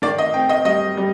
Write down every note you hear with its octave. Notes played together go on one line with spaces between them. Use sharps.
D#3 D5
D#5
C4 G5
D#5
G3 D#5
G3